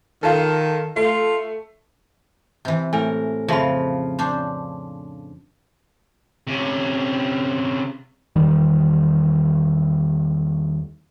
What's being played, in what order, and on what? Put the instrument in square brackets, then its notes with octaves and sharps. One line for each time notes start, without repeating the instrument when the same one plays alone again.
[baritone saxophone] D#3 [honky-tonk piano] F4 A4
[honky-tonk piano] A3 [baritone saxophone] F4
[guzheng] C3 E3
[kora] A2 A#4 [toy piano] G#5
[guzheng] F2 [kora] C#3 F3 [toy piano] E5 B5
[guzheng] C#4 D4 C5
[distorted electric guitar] C3 C#4
[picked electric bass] E2 D#3 G3